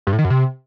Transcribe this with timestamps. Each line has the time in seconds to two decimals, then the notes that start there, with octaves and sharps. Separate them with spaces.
0.07 G2
0.13 A2
0.18 D#3
0.24 F#2
0.30 C3